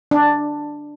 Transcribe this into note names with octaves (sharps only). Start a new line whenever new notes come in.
D4